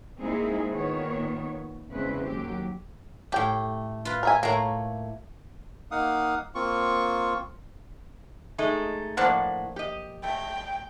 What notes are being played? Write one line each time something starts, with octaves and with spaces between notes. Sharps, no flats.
G#3 A#3 C4 D#4 E4 G#4
A#2 D#3 B3 C#5
E2 C#3 G#3 C4 C#4 B4
D#2 F#3 G4
A2 A3 G4 G5
F4 B4
A#4 E5 G#5
A2 A3 A#3 C#5 A#5
A#3 D#4 F5 F#5 D#6
A#3 C4 F4 C#6
G#3 A3 D#4
A2 F3 A#3 D4 F#5
G4 D#5
A3 G5